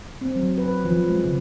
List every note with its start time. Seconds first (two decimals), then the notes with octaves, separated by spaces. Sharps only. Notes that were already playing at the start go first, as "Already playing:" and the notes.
0.21 C4
0.36 F#3
0.58 B4
0.85 F3
1.08 G#3
1.25 C#3